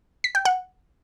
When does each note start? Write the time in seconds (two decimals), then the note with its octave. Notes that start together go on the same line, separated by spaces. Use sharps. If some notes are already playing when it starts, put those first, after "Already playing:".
0.24 B6
0.35 G5
0.45 F#5